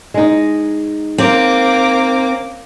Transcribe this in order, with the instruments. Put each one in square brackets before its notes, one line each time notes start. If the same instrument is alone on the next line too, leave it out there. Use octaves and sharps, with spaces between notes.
[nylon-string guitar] G#3 D#4
[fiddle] A#3 D6 [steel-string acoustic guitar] C4